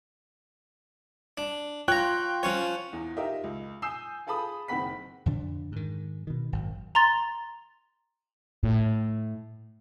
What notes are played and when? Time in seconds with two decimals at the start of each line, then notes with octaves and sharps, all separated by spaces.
1.38 D4
1.88 F4 C#5 G5 A#5 F#6
2.43 F3 C#4 C#5
2.93 E2
3.17 D#4 F4 G4 A#4 D#5 E5
3.44 C#2
3.82 G#5 D#6 E6 G6 C7 E7
4.26 F4 G#4 A4 A5 B5 D#6
4.68 F#1 D#3 C4 F#5 B5 B6
5.26 F2 D3 D4
5.72 G#2 D#3
6.27 B2 D#3
6.52 G#1 F#2
6.95 A#5 C6 A6
8.63 A2